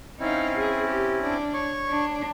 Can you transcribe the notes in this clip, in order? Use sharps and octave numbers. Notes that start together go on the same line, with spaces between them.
C4 C#4 D#4 E4 F5
G#4
G4
D4
C#5 C#6
D4